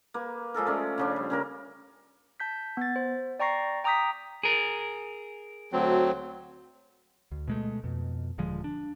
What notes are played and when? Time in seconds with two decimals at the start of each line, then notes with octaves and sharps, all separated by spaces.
0.14 A#3 B4
0.54 F3 G#3 A4 A#4
0.66 A3 C#4 D5
0.98 C#3 F3 D4
1.16 G3
1.30 C#3 A#3 A#4
2.40 A5 G6 B6
2.77 B3 A6
2.96 C5
3.40 D5 G5 A#5 C#6 A#6 C7
3.84 G5 A#5 D6 D#6 G6 B6
4.43 G#4 A#4
5.73 D2 F#3 C4
7.32 D2
7.48 B2 G#3 A3
7.84 F2 B2
8.38 D#1 D3 F3 G#3
8.64 D4